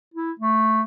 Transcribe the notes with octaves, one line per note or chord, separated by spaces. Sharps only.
E4
A3